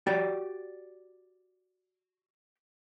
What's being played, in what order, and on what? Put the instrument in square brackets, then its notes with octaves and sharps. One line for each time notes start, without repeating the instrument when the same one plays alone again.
[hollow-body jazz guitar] F#4 G4 D5 G5